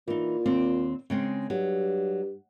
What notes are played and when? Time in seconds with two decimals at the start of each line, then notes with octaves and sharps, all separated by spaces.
0.08 A#2 E3 D#4
0.46 D#2 C4 D5
1.10 C#3 G#3 C4
1.50 G2 F#3